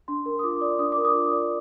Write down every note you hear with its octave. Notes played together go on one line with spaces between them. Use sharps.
D4 C6
A#4
D#6
F4 D6
D5
D4 D#6
A#4 D6
D#6
F4
D5